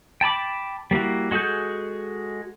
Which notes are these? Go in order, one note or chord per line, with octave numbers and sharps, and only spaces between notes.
G5 A5 B5 D6
G3 A#3 E4 F#4
G#3 F#4 G#4 A4 G6